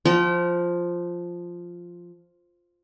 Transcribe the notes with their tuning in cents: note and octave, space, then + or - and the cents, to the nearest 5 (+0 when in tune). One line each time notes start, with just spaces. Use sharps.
F3 +0 G5 -40 A#5 +15